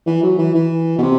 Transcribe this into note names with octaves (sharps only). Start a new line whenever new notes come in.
E3
F#3
E3
E3
B2
C3